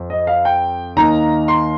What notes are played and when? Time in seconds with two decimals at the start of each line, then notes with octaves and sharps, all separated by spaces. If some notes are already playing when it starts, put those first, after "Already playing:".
Already playing: F2
0.10 D#5
0.27 F5
0.45 G5
0.96 D#2 D#3 A#3 D#4 A#5
1.48 C6